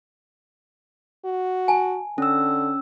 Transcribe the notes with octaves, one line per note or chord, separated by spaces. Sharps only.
F#4
G#5 A5
D3 C#4 E6